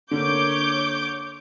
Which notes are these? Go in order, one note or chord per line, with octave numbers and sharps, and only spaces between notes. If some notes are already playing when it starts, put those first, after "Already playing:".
D3 A#3 C#5 D6 G6